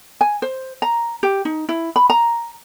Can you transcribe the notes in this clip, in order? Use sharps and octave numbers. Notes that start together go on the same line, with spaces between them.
G#5
C5
A#5
G4
D#4
E4
B5
A#5